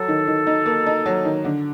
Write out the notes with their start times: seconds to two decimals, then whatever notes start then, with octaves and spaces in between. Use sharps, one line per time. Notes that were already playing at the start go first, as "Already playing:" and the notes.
Already playing: F#3 A4
0.08 D#3
0.27 D#3
0.47 D#4
0.66 A#3
0.86 D#4
1.06 F#3
1.25 D#3
1.45 D3